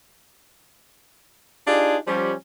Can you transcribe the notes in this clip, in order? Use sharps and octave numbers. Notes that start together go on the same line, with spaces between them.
D4 D#4 F4 G4 G#4 D5
F3 G3 C#4